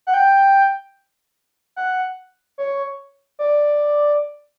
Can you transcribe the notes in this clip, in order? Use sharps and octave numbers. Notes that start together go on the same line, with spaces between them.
F#5
G5
F#5
C#5
D5